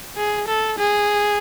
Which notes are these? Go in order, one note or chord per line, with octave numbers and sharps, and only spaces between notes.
G#4
A4
G#4